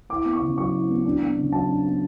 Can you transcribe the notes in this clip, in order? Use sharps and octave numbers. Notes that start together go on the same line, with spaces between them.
E4 D6
B3
C#6
C#3
F#3 C#6
E4
B3
D4
B3
C#3
F#3 A5
D4
B3